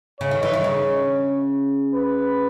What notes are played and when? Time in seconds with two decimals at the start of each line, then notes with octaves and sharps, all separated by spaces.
0.20 C#3 C#5
0.31 D#3
0.43 E3
0.53 D#3
0.64 C#3
1.94 B4